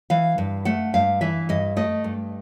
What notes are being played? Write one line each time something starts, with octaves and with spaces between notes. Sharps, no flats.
E3 F5
G2
A3 F#5
G2 F5
E3 E5
G2 D#5
A3 D#5
G2